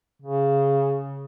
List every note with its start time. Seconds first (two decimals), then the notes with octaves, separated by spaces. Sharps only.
0.22 C#3